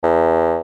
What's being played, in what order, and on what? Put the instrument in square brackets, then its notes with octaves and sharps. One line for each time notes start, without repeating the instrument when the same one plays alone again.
[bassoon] E2